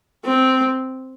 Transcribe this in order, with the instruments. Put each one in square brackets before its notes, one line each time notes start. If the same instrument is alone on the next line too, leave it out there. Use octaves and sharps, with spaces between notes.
[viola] C4